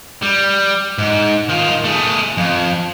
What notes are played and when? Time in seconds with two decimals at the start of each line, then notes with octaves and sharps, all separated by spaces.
0.22 G3
0.98 G#2
1.49 D#3 F4
1.84 A3 G#4
2.37 F2